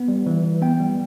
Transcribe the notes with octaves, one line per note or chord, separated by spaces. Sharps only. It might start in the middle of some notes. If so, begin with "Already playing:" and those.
Already playing: B3
G3
E3
E3
B3 G5
G3